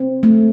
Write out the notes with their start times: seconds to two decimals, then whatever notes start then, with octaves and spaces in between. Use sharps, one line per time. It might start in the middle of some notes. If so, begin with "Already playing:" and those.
Already playing: C4
0.23 A3